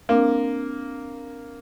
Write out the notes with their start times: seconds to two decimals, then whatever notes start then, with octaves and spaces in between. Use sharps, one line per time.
0.09 A#3 C4 D4